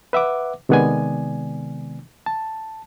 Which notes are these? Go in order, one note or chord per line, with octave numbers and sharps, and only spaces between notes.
B4 E5 F#5 D6
C3 D#3 G#3 B3 D5 G#5
A5